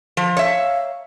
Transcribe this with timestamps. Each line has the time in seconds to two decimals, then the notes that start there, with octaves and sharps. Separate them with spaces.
0.17 F3
0.37 C#5 E5 F5